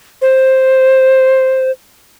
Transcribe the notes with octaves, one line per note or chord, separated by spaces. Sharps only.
C5